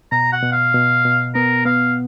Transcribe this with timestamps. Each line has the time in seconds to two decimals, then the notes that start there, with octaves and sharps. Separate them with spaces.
0.12 B2 A#5
0.32 F#5
0.43 B2
0.53 F5
0.74 B2
1.05 B2
1.35 B3 A#4
1.65 B3 F5